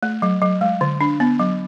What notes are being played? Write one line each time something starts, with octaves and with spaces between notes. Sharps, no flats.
A3
F#3
F#3
G#3
D3
D4
B3
F#3